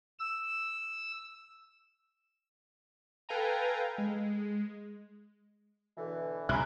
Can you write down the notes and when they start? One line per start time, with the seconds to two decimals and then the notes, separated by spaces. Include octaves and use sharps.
0.19 E6
3.29 A4 B4 F5 G5 G#5 A#5
3.98 G#3
5.97 B2 D3 E3
6.49 C2 A#2 E5 G#5 A#5 B5 F#6